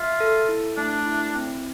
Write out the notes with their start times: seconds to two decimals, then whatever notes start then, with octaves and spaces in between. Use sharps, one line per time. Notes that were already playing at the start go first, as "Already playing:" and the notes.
Already playing: F4 E5
0.20 A4
0.49 E4
0.77 A3 D4
1.06 E4
1.35 C4